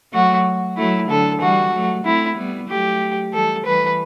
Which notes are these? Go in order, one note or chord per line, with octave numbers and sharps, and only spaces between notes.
F#3 A3 F#4
F#3 A3 E4
D3 F#3 A4
E3 G3 F#4
F#3 A3
A3 C4 E4
G3 B3
F#3 A3 G4
E3 G3 A4
E3 G3 B4